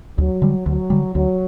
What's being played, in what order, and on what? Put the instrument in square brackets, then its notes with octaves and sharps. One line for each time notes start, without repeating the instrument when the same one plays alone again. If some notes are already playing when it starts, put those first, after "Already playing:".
[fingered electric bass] D2 [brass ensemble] F#3
[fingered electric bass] D3 G3
[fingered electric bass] D2 [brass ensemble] F#3
[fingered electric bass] D3 G3
[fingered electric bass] D2 [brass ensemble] F#3